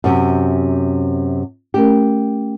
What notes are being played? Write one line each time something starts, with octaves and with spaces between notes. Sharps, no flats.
F#2 C3
A3 C#4 G4 A#4